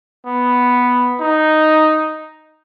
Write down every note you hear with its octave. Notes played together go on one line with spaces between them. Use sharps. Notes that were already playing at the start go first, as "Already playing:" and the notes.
B3
D#4